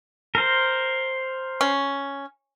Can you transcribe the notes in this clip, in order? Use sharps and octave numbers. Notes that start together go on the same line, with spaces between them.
A#4 C5
C#4